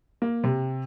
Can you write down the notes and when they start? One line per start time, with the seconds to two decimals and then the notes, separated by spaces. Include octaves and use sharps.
0.22 A#3
0.44 C3